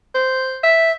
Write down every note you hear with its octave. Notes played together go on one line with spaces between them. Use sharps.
C5
E5